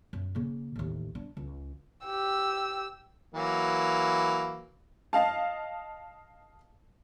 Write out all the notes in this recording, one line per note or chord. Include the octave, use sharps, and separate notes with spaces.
F#2
C#3 A#3
A1 D#2
D4
C#2
G4 E6
E3 F#3 A#3
D#5 F5 A5